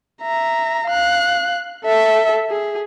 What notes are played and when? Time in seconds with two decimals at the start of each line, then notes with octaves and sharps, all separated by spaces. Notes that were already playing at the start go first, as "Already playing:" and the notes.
0.22 E5 A#5
0.86 F5 F#6
1.86 A4 E5
2.50 G#4